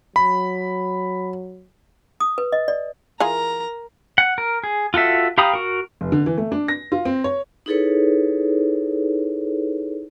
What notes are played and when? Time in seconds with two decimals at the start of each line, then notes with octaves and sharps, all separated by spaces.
0.16 F#3 B5
2.20 D#6
2.38 B4
2.52 D#5
2.68 D5
3.20 E3 F4 G#4 A#4 A#5
4.18 F#5
4.38 A#4
4.64 G#4
4.94 F4 F#4 A4 E5
5.38 G4 F5 A#5 B5 D#6
5.54 F#4 A#4
6.01 F1
6.12 D3
6.26 E3
6.38 A3
6.52 D4
6.68 A#6
6.92 F4
7.05 C4
7.24 C#5
7.66 D#4 E4 G#4 A4 B4 C#5